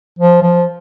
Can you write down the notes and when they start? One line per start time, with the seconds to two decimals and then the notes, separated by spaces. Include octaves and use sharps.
0.19 F3
0.43 F3